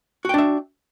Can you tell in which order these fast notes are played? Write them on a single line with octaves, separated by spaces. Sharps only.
F#4 G5 D4 E5